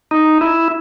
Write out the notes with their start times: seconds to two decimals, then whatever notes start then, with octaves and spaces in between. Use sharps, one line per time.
0.11 D#4
0.41 E4